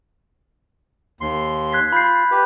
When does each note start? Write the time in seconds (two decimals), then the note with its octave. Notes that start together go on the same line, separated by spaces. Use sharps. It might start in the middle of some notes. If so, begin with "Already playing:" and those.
1.21 D#2 C6
1.73 F#6 G#6 B6
1.92 F4 B5 G6 C7
2.31 G4 B4